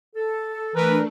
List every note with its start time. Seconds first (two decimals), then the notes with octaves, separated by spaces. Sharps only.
0.15 A4
0.75 E3 A3 D4 A#4 B4